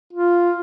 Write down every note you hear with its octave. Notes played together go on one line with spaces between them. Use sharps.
F4